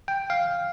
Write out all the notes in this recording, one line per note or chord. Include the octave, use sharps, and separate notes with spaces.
G5
F5